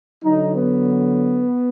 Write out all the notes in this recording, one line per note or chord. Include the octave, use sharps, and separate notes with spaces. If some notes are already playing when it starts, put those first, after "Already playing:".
D3 F#3 D#4
B3